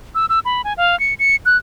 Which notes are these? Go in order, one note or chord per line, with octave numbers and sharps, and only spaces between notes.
E6
E6
B5
G#5
F5
C#7
C#7
F#6